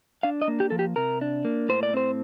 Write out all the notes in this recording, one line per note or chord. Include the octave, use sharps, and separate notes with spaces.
D4 F5
D#5
A#3
G4
F3 A4
G4
C3 A#4
D4
A#3
A2 C5
D5
C4 C5